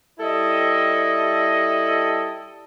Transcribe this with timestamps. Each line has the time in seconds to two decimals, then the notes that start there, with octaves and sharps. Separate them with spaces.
0.19 G3 E4 A4 D#5